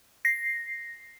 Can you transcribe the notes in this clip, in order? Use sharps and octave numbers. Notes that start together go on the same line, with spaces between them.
A#6 C7